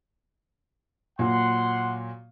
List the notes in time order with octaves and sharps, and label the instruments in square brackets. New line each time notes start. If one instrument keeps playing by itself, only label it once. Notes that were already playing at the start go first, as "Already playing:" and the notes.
[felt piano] A#2 F#3 [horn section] F#5 C6